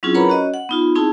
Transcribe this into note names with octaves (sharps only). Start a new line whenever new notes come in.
F#3 C4 C#4 E4 F4 G#4
A#4 B4 C#5 F#5 A#5 B5
C#4 F#4 C#5 D#5
F#5
B3 D#4 F4
C4 D#4 E4 G#4 A5